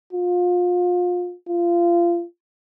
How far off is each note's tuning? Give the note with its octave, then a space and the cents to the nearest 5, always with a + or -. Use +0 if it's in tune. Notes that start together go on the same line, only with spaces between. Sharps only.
F4 +30
F4 -25